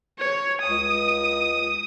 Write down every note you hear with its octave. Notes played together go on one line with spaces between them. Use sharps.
C#5
C#2 D#6